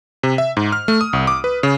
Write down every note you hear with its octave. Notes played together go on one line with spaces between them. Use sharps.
C3
E5
G#2
F6
A3
D#6
C2
D6
B4
C#3